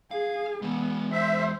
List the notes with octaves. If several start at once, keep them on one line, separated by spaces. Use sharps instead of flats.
G#4 F5
E3 G#3 B3
C5 E5